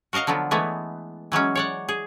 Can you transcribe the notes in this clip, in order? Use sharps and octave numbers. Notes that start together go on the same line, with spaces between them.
F#4 A#4 D#5 F5 A#5
D3 F3 F#3 B3
E3 G#3 A3 B3
E3 F#3 G#3 C#4
C#5 D5 F#5
G#4